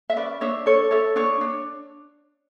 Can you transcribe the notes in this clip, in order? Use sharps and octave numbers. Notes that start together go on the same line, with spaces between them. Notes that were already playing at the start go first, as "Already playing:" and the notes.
E5
C#4 B4 D5
D4 C#5 E5
A4 C#5
A4 C#5 E5
D4 C#5
D4